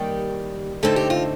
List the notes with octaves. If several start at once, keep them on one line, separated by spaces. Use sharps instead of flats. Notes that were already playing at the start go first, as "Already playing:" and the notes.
Already playing: D#2 D#3 G3 G4
D3 A3 C4 D#4 A4
G4
F4